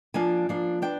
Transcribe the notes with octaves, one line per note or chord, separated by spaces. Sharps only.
F3 A#3 D4 G#5
F3 A#3 D4
B3 D4 G5